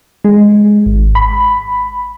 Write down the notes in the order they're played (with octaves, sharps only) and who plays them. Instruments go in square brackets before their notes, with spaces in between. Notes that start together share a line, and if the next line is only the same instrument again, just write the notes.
[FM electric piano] G#3
G#1
B5